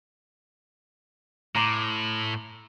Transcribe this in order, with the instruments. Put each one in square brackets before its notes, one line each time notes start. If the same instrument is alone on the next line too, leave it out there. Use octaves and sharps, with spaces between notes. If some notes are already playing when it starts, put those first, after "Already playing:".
[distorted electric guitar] A2 [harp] A#5 C6 D6